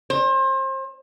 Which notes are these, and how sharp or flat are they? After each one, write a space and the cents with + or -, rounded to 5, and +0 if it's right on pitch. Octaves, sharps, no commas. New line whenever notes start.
C5 +35